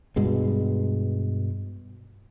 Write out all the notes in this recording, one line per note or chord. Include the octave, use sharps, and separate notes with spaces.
G2 B2 G#3